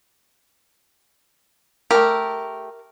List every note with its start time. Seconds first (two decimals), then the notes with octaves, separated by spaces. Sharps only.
1.91 A3 G4 A#4